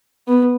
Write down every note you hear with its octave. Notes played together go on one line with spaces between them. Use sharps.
B3